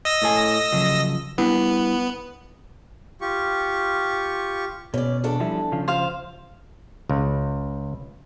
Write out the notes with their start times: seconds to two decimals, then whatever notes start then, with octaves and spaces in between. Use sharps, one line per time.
0.05 D#5 E6 A#6
0.22 A2 A4 G#5
0.72 C#3 F3 F#3
1.38 G3 B3 D4 E4
3.21 F4 G4 C#6
4.94 B2 C#4 D5
5.24 E2 D4 A4
5.40 F3 G3 E4
5.72 C#3 F3 F4
5.88 C5 F5
7.10 C#2